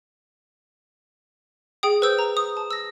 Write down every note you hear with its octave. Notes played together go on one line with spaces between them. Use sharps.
G#4 G5 D#6
B4 C5 E6 G6
A#5
D#6
A5
E6 A#6